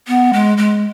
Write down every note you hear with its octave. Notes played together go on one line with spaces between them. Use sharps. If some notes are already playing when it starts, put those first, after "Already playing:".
B3
G#3
G#3